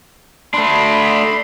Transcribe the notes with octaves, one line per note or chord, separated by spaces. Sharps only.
A3 D4 B5 C6